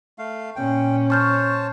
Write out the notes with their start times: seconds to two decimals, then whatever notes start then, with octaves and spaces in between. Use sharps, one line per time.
0.18 A3 F5
0.56 A#2 C#4 G5
1.10 C5 C#5 A5 C#6 F6 G6